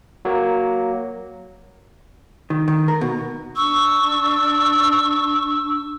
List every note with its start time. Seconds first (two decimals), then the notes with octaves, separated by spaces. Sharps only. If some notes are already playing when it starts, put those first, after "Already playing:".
0.25 F#3 A#3
2.50 D#3
2.68 D#3
2.88 A#4
3.01 B2
3.56 D4 C#6 E6